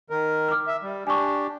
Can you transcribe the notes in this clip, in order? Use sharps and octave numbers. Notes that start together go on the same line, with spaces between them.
D#3 A#4
D6 F6
E5
G3
D4 G4 G#5 C#6